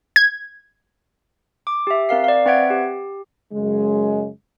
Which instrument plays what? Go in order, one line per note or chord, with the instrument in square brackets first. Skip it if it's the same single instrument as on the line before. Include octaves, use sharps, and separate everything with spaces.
[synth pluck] G#6
[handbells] D6
G4 E5
C4 A#4 F5 C7
D5 F5
C4 B4 E5 F#5 G#6 D7
G4
[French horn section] F#2 C#3 G#3